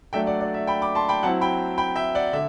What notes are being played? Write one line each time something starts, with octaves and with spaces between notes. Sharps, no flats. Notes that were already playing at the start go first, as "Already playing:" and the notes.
F#3 A3 D4 E5 G5
D5 F#5
D5
E5
G5 B5
B5 D6
A5 C6
G5 B5
F#3 C4 E4 F#5 A5
G5 B5
G5 B5
E5 G5
D5 F#5
D3 E5